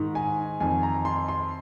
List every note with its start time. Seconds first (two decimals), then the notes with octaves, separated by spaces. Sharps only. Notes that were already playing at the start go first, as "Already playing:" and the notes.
Already playing: G#2 D#3
0.15 G#5
0.60 F2 D#3 G#5
0.83 A#5
1.05 C6
1.28 C6